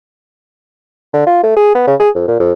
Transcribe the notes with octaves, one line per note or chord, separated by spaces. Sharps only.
D3
F4
A3
G#4
B3
C#3
G#4
F2
A#2
F2